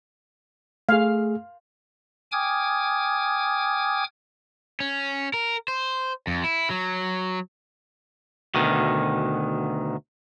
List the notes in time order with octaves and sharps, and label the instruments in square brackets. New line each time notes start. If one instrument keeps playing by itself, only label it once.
[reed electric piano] A3 G#4 [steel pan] F5
[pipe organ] G5 G#5 D6 D#6 F6 G#6
[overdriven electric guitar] C#4
A#4
C5
F2
E4
F#3
[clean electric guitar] D2 B2 D#3